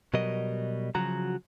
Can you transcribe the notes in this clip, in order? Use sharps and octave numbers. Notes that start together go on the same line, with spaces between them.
B2 F#3 G3 A#4 D#5
C#3 F3 F#3 F#4 A#5